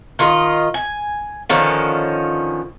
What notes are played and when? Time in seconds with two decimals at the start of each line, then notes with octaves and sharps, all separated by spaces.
0.19 D#3 F4 A4 D#5
0.74 G#5
1.49 D3 D#3 F3 C#4